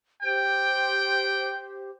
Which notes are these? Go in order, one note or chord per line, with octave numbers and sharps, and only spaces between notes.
G4 C5 G5